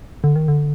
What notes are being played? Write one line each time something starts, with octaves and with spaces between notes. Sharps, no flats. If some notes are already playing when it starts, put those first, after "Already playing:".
D3
D#3
D3